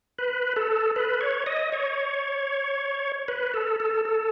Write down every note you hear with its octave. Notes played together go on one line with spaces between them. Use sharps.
B4
A4
B4
C#5
D#5
C#5
B4
A4
A4
A4